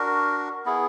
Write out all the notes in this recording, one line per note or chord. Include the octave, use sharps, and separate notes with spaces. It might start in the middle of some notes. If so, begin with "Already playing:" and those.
Already playing: D4 F#4 A#4
B3 E4 G#4